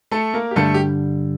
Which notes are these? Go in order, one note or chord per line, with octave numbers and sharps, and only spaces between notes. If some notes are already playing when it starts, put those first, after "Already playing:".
A3 A4
A#3 A#4
G4
G2 D3 G3 A3 A4
G4